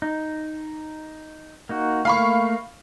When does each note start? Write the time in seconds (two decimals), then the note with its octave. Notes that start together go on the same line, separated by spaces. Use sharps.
0.02 D#4
1.69 A#3 D#4 F#4
2.05 A3 A#3 F5 B5 C#6